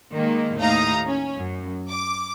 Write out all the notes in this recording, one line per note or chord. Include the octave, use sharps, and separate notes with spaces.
D#3 G#3 A#3
D#2 A2 D#4 F5 A#5 D#6
C#4
F#2
D6